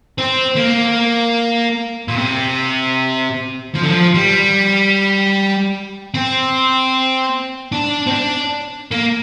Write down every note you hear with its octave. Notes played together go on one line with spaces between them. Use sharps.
C4
A#3
A#2
C3
F3
D3
F3
G3
C4
D4
C4
D4
A#3